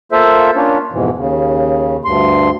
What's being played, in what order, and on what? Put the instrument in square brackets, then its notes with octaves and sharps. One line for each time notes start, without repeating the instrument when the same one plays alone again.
[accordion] A#3 F4 A4 C5 E5
A#3 C#4 D4 F4 C#5
F2 G#2 B2 E3
D#2 C#3
D2 G2 C6